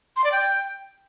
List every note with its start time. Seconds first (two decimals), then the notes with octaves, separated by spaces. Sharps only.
0.16 C6
0.24 D5
0.32 G5